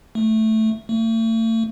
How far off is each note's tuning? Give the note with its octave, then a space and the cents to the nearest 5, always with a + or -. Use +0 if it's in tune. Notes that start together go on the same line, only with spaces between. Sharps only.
A3 +0
A3 +40